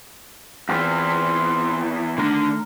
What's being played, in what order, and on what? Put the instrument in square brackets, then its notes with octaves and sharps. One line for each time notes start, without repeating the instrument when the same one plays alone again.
[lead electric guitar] E2 E3 [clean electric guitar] C4 F4
[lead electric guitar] D3 [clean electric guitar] D#3 A3 A#4